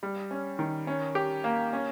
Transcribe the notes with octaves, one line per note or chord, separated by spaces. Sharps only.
G3
C#4
D#3
C#4
G4
A#3
C#4